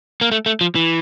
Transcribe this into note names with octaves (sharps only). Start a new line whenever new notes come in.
A#3
A3
A3
F3
E3